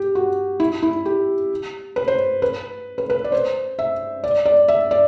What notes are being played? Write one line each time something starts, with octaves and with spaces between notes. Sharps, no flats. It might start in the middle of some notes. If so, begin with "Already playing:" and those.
Already playing: G4
F#4
E4
E4
G4
B4
C5
B4
B4
B4
D5
C5
E5
D5
D5
E5
D5